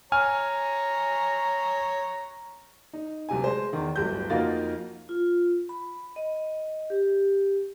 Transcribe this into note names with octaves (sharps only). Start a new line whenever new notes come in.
C#5 G#5 A#5 F6
D#4
D1 C3 G#5
G#3 C5
E2 D#3
D1 G1 G3 G6
F2 A#3 D#4 F4 F#4 A6
F4
B5
D#5
G4